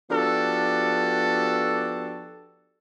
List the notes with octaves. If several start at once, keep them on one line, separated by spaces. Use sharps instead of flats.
F3 B3 D4 F#4 G4 A4